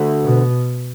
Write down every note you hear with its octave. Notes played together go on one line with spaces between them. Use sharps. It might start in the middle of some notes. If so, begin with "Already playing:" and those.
Already playing: D2 D3 A3 F#4
B2